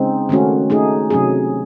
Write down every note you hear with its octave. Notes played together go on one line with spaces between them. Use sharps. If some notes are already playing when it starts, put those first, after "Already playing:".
Already playing: C#3 G#3 C4 D#4
D#3 A3 C#4 F#4
A3 D#4 G#4
C3 F#3 C#4 G#4